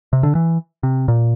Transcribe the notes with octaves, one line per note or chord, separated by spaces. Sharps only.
C3
D3
E3
C3
A#2